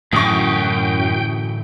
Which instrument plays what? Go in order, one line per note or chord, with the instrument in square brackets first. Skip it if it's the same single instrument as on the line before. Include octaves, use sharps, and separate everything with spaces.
[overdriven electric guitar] F#2 [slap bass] A2 D3 E3 [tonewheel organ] G5 [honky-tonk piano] C#6 D#6